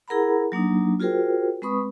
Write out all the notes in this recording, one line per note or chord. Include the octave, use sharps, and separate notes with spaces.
E4 G#4 A#4 F#5 A#5 B5
F#3 A#3 D4 D#4
F4 F#4 G#4 A#4 C5 G5
G#3 C4 B4 B5 C#6 D#6